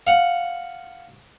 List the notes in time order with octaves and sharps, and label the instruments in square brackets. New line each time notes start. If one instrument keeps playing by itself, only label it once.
[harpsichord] F5 F#5